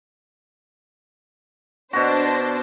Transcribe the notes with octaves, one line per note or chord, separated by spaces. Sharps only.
B2 D4 F#4 C5